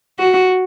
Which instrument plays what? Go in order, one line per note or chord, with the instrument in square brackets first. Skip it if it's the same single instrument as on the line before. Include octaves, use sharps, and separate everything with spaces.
[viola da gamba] F#4